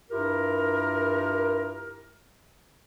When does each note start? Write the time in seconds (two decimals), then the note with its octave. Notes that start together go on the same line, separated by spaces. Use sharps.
0.11 G2 E4 F4 G4 A#4